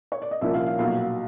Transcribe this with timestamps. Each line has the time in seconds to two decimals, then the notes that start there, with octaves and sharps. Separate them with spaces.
0.12 C#5
0.22 D5
0.31 D#5
0.41 C2 A#2 F3 A#3 C#4 E5
0.54 F5
0.66 F5
0.79 B1 A#2 F#3 F5